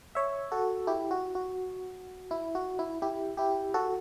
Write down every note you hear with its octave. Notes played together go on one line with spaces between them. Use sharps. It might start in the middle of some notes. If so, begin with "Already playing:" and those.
C#5 E5
F#4 A4
E4 G4
F#4
F#4
E4
F#4
E4
E4 G4
E4 G4
F#4 A4